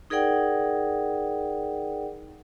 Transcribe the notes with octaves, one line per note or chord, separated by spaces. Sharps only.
D#4 G#4 A#4 D5 F#5 G5